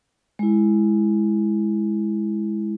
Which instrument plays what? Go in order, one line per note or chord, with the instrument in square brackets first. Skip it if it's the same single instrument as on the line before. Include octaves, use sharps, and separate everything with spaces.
[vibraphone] G#3 E4